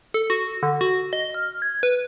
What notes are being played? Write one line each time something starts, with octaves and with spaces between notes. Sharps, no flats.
A4
F#4
D3
F#4
D#5
F6
G#6
B4